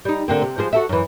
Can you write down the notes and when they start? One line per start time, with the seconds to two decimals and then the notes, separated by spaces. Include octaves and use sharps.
0.05 G3 D#4
0.28 D3 A#3 C4
0.42 C3
0.58 F3 G#3 C5
0.73 F#4 A4 E5
0.89 F#2 E3